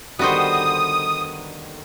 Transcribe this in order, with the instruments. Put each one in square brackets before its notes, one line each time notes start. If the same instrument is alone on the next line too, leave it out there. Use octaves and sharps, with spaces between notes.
[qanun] D3 D#3 G3 [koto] B3 F#4 C5 [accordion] D#6